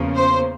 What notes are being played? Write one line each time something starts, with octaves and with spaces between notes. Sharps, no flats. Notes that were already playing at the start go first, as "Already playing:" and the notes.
Already playing: E2 C#3 F3 A#3
C5